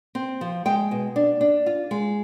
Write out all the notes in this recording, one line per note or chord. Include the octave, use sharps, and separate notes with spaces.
C4
F3
G#3 G5
B2
D4
D4
F4
G#3